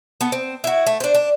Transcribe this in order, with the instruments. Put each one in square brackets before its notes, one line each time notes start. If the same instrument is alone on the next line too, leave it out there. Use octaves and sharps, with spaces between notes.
[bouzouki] B3 A4
C4
E4 F#4
A3
D4 C5
D4